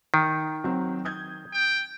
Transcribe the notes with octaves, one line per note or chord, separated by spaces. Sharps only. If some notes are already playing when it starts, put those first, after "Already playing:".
D#3
F#3 C4
D#6 G6 G#6
G5